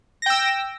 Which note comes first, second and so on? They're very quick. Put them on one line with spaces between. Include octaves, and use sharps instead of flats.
A#6 G5 E6